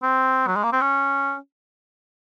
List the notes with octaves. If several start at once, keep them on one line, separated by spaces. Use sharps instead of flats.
C4
F#3
G#3
A#3
C4
C#4